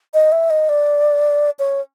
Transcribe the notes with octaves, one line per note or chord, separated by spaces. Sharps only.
D#5
E5
D#5
D5
C#5